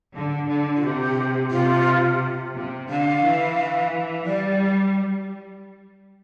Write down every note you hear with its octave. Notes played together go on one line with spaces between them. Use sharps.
D3
D3
F4
C3 G4
C3 F4
C3
D3 F5
E3
G3 D5